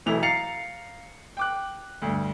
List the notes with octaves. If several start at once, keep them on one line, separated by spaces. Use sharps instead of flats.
E1 B1 E3 A3 E4 F7
F5 A#5 A6 C7 C#7 F7
G5 D6 F#6
D2 G2